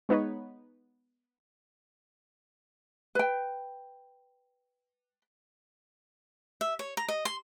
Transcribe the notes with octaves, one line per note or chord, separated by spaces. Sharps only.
G#3 B3 D#4 B4 C#5
B4 G5
E5
C#5
A#5
D#5
C6